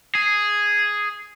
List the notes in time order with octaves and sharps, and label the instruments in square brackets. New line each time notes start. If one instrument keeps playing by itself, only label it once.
[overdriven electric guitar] G#4